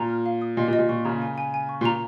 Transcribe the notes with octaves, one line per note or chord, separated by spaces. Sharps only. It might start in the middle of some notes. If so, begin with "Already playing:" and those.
Already playing: A#2 A#5
F6
F5
D#6
A#2 D#5
A#2
D#5
A#2
A#2 C#6
C#3 A#5
G#5
G#5
G#5
C#6
A#2
A#5